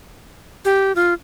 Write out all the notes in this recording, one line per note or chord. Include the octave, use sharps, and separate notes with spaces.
G4
F4